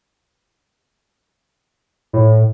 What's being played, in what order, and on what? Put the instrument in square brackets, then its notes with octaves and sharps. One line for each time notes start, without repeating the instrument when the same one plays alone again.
[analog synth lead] A2